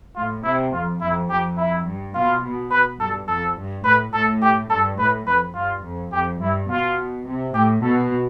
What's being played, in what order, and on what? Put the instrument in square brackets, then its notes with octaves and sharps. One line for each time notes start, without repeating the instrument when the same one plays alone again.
[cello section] A2 [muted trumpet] F4
[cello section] C3 [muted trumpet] E4
[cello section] F2 [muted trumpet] F4
[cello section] F2 [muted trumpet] E4
[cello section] F2 [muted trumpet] G4
[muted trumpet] E4
[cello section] G2
[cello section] B2 [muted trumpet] F4
[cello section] B2
[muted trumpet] B4
[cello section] G2 [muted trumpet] A4
[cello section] F2 [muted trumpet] A4
[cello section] G2
[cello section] A2 [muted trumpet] B4
[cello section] A2 [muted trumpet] A4
[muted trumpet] G4
[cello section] G2 [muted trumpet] A4
[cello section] A2 [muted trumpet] B4
[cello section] F2 [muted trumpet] B4
[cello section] G2 [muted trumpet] F4
[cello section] F2
[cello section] F2 [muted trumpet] G4
[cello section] G2 [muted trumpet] E4
[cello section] B2 [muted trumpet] F4
[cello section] C3
[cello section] A2 [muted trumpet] G4
[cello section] B2 [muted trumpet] A4